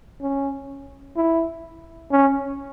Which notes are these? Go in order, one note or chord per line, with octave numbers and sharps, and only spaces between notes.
C#4
E4
C#4